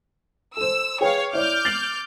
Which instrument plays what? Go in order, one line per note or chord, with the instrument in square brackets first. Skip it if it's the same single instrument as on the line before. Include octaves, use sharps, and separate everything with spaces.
[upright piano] A4 C5 [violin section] E6
[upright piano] G#4 B4 G5 [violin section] C#5 F5
[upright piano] E4 C#5 D5 [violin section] D6 F6 G6
[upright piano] A6 C7 F#7